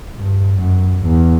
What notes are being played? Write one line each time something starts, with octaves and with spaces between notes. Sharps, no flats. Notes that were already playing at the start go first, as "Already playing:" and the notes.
G2
F#2
E2